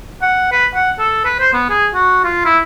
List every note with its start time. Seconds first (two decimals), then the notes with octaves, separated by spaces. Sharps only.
0.22 F#5
0.52 B4
0.74 F#5
1.00 A4
1.25 B4
1.40 C5
1.54 B3
1.70 G#4
1.94 F#4
2.24 F4
2.45 E4